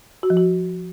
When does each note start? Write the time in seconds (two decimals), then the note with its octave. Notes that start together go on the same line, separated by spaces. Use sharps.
0.23 F#4
0.30 F3
0.37 F#4